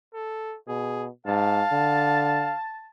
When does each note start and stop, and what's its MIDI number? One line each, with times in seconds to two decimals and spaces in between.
0.14 0.57 69
0.68 1.09 47
0.68 1.06 68
1.27 1.63 44
1.27 2.58 77
1.27 2.90 81
1.72 2.54 50